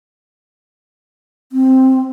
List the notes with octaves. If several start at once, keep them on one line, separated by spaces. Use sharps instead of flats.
C4